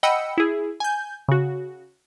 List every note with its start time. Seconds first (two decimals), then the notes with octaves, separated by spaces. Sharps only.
0.03 D#5 F#5 G5 B5 E6 C#7
0.38 E4 G#4
0.80 G#5 G6
1.29 C#3 F#4